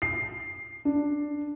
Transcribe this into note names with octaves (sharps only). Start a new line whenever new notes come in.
C7
D4